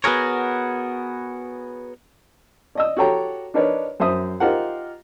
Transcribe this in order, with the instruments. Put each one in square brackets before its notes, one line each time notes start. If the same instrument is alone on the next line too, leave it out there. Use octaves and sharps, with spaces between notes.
[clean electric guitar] B3 F#4 G#4 A#4 C#5
[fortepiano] D5 D#5 E6
F#4 G4 A4 C#5 G5 A#5
D4 D#4 A#4 B4 C#5 D5
F#2 C5 E5 D#6
D#4 F4 G4 A#4 C5 F#5